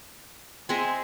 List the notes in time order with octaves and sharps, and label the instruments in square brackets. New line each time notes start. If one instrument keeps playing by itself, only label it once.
[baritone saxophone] G#3 [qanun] C4 G#4 E5